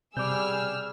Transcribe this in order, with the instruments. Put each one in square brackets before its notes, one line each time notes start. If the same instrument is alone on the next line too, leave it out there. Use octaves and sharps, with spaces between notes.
[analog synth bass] C3 [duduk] G3 [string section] G#4 E6 F6 [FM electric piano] D6 G6